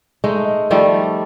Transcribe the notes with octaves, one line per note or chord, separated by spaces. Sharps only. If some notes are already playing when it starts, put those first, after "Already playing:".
G#3 A3 D#4
D#3 F3 G3 A3